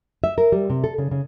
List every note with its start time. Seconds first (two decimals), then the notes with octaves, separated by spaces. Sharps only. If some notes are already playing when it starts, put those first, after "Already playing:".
0.24 E5
0.38 A#4
0.52 G3
0.70 C3
0.84 A4
0.98 C#3
1.11 C#3